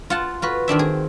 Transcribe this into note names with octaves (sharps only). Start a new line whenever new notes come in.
F4 F#5 A5
F4 F#4 B4
D#3 C4 D4 E5
G#4